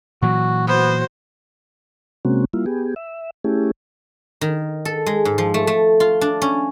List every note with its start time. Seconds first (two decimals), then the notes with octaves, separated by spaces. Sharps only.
0.22 A#2 E3 F#3 F#4
0.68 B3 F#4 C5
2.25 C3 G#3 A#3 C4 C#4 F#4
2.53 G3 A#3 E4 F4
2.66 B3 G4 G#4
2.96 E5
3.44 A3 C#4 E4 G4 G#4
4.41 D#3
4.85 A4
5.06 G#3
5.25 G#2
5.38 F3
5.54 A3
5.67 A3
6.00 F4
6.21 D4
6.42 C#4